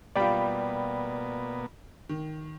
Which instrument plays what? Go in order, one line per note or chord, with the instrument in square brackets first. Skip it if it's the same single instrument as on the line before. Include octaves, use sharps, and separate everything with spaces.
[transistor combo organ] B2 A#3 B3 [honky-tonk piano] G3 F4 [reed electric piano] D5 G5 B5
[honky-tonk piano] D#3